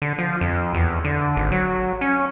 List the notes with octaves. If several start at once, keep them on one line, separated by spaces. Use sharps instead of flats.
D3
F3
F2
E2
D3
G#1
F#3
C#4